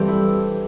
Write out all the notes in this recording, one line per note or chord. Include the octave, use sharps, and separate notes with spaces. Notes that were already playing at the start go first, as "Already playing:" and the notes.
Already playing: G2 E3 G3 C4 G4 A4
E4